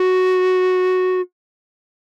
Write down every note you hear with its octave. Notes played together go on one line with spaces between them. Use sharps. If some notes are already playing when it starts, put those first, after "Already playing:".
Already playing: F#4